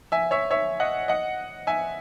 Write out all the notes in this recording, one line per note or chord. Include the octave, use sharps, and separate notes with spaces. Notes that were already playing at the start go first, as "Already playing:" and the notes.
E5 G#5
C#5 E5
C#5 E5
D#5 F#5
D#5 F#5
E5 G#5